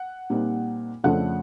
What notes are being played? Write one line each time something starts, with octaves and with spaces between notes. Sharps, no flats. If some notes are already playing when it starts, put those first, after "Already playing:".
Already playing: F#5
A#2 G3 C4 D#4
F2 C#3 F3 A3 D4 F#5